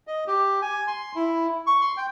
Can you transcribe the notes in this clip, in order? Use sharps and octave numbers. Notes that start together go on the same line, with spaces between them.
D#5
G4
G#5
C6
E4
C#6
C6
G5